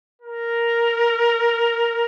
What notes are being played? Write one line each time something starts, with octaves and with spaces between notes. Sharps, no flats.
A#4